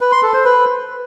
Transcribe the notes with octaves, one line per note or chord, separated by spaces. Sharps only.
B4
C6
A4
C5
B4